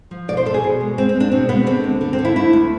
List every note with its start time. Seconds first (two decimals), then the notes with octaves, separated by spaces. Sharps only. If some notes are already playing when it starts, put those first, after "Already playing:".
0.11 F3
0.28 B2 D5
0.37 C5
0.45 B2 A4
0.54 G#4
0.64 B2
0.80 G#3
0.98 G#3 C4
1.09 C4
1.15 G#3
1.20 D4
1.32 B2 C4
1.49 G#3 B3
1.67 D3 C4
1.84 D2
2.01 D3
2.13 C4
2.19 D3
2.25 E4
2.36 A3 E4
2.53 D2